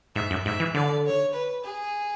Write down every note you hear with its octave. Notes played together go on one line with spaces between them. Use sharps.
G#2 E5
F#2
G#2 E5
E3
D3 D5
C#5
B4
G#4